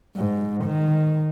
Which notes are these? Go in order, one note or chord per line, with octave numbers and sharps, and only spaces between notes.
G#2
D#3